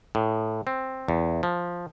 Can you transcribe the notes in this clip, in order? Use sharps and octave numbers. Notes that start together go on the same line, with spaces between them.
A2
C4
E2
F3